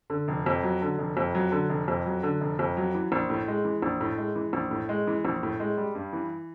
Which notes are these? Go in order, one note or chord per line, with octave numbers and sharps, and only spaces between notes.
D3
F1
F2
F#3
D3
F1
F2
F#3
D3
F1
F2
F#3
D3
F1
F2
F#3
E3
A#1
A2
G#3
E3
A#1
A2
G#3
E3
A#1
A2
G#3
E3
A#1
A2
G#3
G3
G2
E3